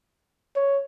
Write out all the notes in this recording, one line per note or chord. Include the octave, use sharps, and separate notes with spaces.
C#5